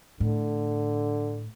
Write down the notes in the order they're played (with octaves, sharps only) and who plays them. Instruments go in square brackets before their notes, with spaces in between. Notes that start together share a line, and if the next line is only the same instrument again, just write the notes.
[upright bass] A2 [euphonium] D3